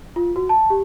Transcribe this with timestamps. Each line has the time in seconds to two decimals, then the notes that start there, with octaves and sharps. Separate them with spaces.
0.16 F4
0.36 F#4
0.49 A5
0.70 G4